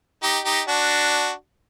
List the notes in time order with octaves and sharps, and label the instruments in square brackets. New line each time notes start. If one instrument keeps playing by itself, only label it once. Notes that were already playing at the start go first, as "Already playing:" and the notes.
[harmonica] D#4 G4
D#4 G4
D4 F#4